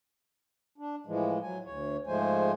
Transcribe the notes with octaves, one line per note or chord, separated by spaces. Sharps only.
D4
A2 E3 F3 G#3
F#3 G#5
D2 C#5
G#2 F3 G#3 A3 C5 G#5